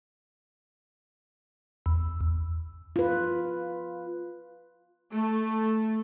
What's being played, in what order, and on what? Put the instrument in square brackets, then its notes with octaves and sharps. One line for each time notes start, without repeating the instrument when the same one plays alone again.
[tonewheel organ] E2
[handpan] F4 B4
[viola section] A3